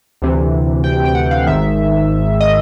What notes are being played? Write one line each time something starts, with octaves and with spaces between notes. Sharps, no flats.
D2 C3 E3
G5
G5
F#5
F5
G#1 G#2 D#3 E5
D#5